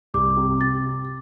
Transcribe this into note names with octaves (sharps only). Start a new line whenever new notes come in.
C2 D6
C3
C3 A6